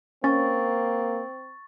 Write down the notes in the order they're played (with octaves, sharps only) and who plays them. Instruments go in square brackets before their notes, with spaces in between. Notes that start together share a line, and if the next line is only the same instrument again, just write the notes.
[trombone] A#3 [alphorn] C4 [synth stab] C#4 [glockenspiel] C#6 A6